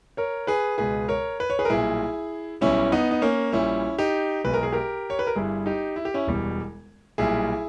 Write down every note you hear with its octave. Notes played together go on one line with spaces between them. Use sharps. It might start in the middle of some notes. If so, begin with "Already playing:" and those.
A#4 C#5
G#4 B4
C#2 B2 G#3 G#4 B4
A#4 C#5
B4
C#5
G#4 B4
A#4
B1 A#2 G3 E4 G#4
B1 B2 G3 C#4 E4
B3 D#4
D#4
A#3 C#4
A#1 A#2 G3 C#4 E4
D#4 G4
B1 B2 G#3 B4
A#4
G#4
G4 A#4
C#5
B4
A#4
G1 G2 G3 E4 G#4
D#4 G4
E4
G4
C#4 E4
E1 E2 B2 G3
B1 A#2 G3 E4 G#4